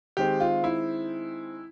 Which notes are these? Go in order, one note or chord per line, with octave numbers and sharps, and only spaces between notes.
D#3 G#3 C4 G4
F4
E4